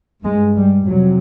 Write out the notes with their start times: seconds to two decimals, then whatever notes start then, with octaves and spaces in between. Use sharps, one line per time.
0.24 G2 G#3
0.56 G3
0.87 F2 C3 F#3